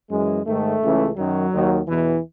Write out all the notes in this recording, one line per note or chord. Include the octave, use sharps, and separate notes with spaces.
F#2 E3 G#3
G#2 D#3 A3
C#2 C#3 E3
F#2 D#3 F#3
D#2 D#3
E2 B2 E3